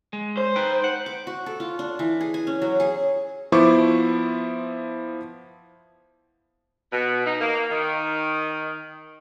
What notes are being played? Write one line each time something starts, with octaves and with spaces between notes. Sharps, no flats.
G#3
C5
D#4 B4 G5
F#5
D6
F#4
A4
F4
D4
E3
G#4
G#5
C#4
F#3
G#4
F3 B3 E4 C5 C#6 D6
B2
D#4
A#3
D#3